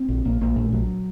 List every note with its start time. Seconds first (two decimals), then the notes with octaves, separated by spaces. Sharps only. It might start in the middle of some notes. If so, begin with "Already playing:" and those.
Already playing: C4
0.09 A#1
0.25 A#1 A#3
0.41 A#1 A#3
0.56 A#2 A3
0.72 A#1 F#3